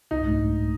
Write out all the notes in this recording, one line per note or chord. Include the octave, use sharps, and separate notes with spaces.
C2 D#4